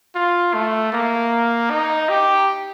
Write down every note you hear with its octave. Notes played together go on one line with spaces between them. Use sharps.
F4
A3
A#3
D#4
G4